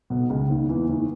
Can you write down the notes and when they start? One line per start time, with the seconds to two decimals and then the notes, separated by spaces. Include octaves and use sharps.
0.10 B1 B2
0.30 C#2 C#3
0.50 D#2 D#3
0.69 E2 E3
0.89 D#2 D#3